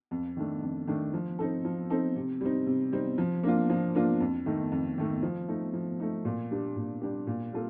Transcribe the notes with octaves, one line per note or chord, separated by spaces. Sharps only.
F2
D#3 A3 D4
F2
D#3 A3 D4
F3
C4 D#4 A4
F3
C4 D#4 A4
C3
G3 C4 D#4
C3
G3 C4 D#4
F3
A#3 D4 F4
F3
A#3 D4 F4
F2
D#3 A3 D#4
F2
D#3 A3 D#4
F3
A3 D#4
F3
A3 D#4
A#2
G3 D4 G4
A#2
G3 D4 G4
A#2
G3 A#3 F4 A4